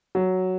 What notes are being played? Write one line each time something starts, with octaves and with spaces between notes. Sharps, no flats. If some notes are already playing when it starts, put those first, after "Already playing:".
F#3